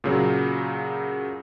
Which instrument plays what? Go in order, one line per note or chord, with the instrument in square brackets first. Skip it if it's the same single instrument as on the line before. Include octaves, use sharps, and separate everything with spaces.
[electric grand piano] A#2 C#3 F#3